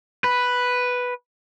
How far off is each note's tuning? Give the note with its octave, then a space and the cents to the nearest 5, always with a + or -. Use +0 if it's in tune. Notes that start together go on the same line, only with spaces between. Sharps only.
B4 +0